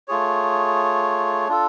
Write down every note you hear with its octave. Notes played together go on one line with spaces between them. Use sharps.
A3 F4 G#4 C#5
D4 F4 A4